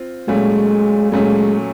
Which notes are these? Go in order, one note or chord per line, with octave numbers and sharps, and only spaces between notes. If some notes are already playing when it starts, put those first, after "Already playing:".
Already playing: C4 F4
A#2 F#3 G#3 A3 C#4
A#2 F#3 G#3 A3 C#4